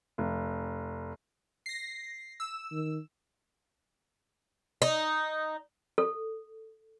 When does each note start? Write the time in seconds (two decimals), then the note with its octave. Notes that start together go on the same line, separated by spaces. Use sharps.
0.18 F1
1.66 A#6 C7
2.40 E6
2.72 D#3
4.82 D#4
5.98 A4